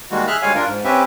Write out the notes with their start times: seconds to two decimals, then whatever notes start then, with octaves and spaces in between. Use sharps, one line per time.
0.11 D#3 G3 G#3 A#3 F#4
0.27 G#4 E5 F6 F#6
0.42 D2 G3 G#3 C#5 F5 G#5
0.55 D4 F4 A#4
0.67 G#2
0.84 C4 C#4 G4 B4 E5